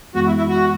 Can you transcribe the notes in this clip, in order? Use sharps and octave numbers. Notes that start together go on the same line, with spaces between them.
F#2 E3 G#3 B3 F#4
E4
E4
F#4